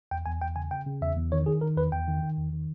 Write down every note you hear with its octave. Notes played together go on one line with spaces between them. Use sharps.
E2 G5
E2 G#5
E2 G5
C#3 G#5
C#3 G5
C#3
E2 E5
E2
D#3 C#5
D#3 G#4
D#3 A#4
E2 B4
E2 G5
D#3
D#3
E2
D#3